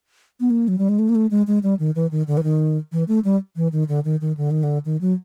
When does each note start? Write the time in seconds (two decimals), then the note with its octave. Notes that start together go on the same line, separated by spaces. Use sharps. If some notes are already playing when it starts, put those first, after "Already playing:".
0.40 B3
0.50 A#3
0.68 F#3
0.78 G3
0.89 G#3
0.99 A3
1.09 A#3
1.15 A3
1.31 G#3
1.47 G#3
1.63 G3
1.79 D#3
1.95 E3
2.11 D#3
2.27 D3
2.37 E3
2.44 D#3
2.92 E3
3.08 A3
3.25 G3
3.56 E3
3.72 D#3
3.89 D3
4.05 D#3
4.21 D#3
4.37 D3
4.51 D#3
4.63 D3
4.85 D#3
5.01 F#3